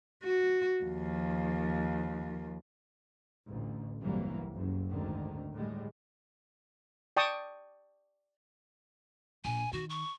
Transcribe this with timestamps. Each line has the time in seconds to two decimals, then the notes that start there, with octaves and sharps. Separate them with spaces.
0.24 F#4
0.81 D#2 F3
3.47 A1 D2
4.00 G1 C2 E3 F#3 G3 A#3
4.52 F#1 F#2
4.89 G#1 D2 G#2 D3 D#3
5.54 A2 G3 G#3
7.17 D5 G5 A5 C#6 D#6
9.45 A#1 G#5
9.73 D#3 F#4
9.90 C#6